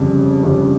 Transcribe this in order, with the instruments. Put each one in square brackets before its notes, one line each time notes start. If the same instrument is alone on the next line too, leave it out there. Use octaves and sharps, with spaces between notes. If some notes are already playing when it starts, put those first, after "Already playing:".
Already playing: [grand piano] G1 F2 C#3 G3
G1 F2 C#3 G3